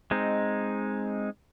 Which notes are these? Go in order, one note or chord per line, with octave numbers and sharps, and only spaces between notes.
G#3 C4 D#4